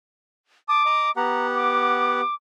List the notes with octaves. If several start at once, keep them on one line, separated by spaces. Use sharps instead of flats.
A5 D6 D#6
D#5 A#5 D#6
B3 G4 F#5 A#5
D6